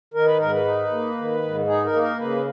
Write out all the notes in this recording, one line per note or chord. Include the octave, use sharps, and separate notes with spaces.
D#3 A#4
B4
G#2 A#4
B4
D#4
A#3
D#3
G#2
D#4 G#4
A#4
A#3
A#4
C#3 B4